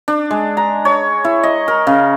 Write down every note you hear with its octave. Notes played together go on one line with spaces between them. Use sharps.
D4
G#3
A#5
C#5
E4
D#5
A#4
C#3